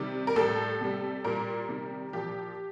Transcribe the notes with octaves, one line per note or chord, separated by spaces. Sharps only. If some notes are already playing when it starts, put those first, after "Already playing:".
Already playing: C3 D#3 G3
A#4
A2 G3 A4
C3 G3
A#2 G3 A#4
C3 D#3 G3
A#2 F3 G4